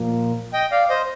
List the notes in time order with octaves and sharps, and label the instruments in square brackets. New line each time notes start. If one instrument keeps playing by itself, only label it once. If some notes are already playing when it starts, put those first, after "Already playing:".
Already playing: [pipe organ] A#2 F3 A#3
[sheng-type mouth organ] D#5 G5
D5 F5
C5 D#5